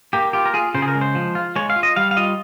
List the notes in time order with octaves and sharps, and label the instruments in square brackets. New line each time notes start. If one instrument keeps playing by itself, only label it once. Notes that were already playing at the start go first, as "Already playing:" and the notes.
[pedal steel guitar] A#3 G4
F4 G4
A#4
F4 G#4
C#3 C5
G#4
A#4
G#3
C5
F3
F4
G#3 C#5
F5
F4
D#5
G3 F5
F5
F4 D#5